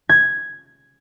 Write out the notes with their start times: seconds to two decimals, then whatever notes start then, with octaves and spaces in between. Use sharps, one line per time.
0.09 G#6